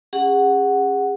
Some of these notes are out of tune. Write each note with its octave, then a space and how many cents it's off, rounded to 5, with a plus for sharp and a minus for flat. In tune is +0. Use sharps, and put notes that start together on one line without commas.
C#4 +0 G#4 -35 F#5 +0